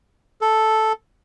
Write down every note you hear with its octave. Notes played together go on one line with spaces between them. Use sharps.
A4